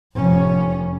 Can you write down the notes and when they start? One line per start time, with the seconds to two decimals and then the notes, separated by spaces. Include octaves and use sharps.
0.13 F1 C#4